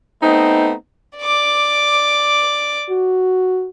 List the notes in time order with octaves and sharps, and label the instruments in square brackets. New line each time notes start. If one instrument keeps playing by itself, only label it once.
[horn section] A3 B3 C4 D#4
[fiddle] D5 D6
[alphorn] F#4